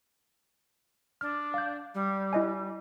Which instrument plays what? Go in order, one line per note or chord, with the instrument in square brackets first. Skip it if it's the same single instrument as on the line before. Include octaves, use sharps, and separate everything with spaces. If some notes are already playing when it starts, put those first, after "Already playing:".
[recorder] D4 [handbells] F6
[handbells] F5 G6
[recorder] G3
[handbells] E4 D#5 G#5